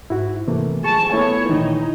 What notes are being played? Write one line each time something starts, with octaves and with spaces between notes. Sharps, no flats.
G#2 E4 F#4
C3 E3 A3 A#3
G#4 A5 C#6
A3 B3 E4 C#5
A#2 D#3 E3 D#4